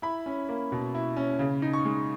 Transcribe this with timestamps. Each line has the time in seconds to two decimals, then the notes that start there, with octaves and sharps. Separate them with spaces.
0.02 E4 B5
0.26 C#4
0.49 A#3
0.72 B2
0.95 E4
1.16 C#4
1.39 C#3
1.62 D#4
1.73 C#6
1.85 G#3